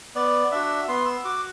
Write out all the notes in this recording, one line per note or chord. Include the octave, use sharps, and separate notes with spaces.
B3 D5
D4 F#4 E5
B3 C6
E6
F#4 D6